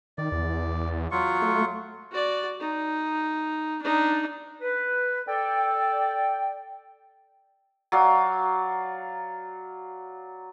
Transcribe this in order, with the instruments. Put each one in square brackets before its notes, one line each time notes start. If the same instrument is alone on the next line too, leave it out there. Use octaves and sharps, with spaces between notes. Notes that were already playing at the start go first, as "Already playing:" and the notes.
[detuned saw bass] D#3 [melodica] D5
[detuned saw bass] E2
[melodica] F#3 F4 C#6
[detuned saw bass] A3
[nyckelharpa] F#4 D5
D#4
D4 D#4
[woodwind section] B4
[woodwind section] A4 D5 [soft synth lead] G5
[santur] F#3 D5 F5